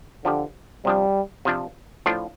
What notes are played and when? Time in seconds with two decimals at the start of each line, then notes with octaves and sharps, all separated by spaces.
0.25 D3 F3 D4 G4
0.85 C3 F3 G3 D4
1.45 C3 F3 D4
2.06 A2 F3 D4 F4